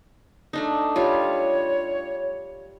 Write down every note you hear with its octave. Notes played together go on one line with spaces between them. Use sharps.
A3 D4 D#4
G3 F4 C#5